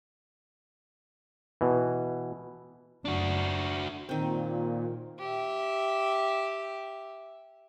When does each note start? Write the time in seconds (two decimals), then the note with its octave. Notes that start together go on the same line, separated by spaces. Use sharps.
1.61 B2 E3
3.05 F#1 D4 F#4
4.09 A#2 D#3 C4
5.19 G4 E5